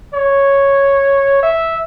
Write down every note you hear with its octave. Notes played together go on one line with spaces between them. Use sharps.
C#5
E5